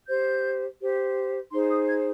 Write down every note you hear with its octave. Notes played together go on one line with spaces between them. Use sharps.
G4 C5 G6
G4 C5
D#4 G#4 C5 C6
D#6
G#6